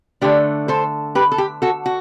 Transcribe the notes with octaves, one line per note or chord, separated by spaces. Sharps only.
D3 A3 D4 G4
A4 C5
G4 B4
A4
G4
F#4 A4
F#4